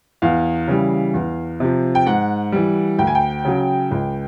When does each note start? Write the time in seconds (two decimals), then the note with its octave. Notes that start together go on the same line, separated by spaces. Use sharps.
0.22 E2 F5
0.68 C#3 E3 G3
1.14 E2
1.60 C3 F3
1.95 G5
2.07 G#2 F#5
2.52 E3 G3
2.99 D2 G5
3.07 G#5
3.15 G5
3.45 C#3 F#3
3.91 C#2